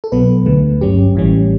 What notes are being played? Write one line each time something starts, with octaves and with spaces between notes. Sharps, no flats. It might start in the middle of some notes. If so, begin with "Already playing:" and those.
A4
B1 B2 F#3 B3 B4
D2 D3 A3
G1 G2 F#3 C#4 G4
A1 A2 E3 G3 C#4